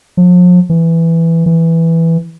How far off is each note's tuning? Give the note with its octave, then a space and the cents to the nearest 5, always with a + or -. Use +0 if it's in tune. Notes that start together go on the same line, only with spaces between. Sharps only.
F3 +40
E3 +5
E3 +0